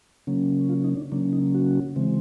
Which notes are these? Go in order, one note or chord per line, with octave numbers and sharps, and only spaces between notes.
C#3 F#3 A#3 C#4
F4
D#4
D4
C#3 F#3 A#3 C#4 D4
D#4
F#4
C#3 E3 G#3 C4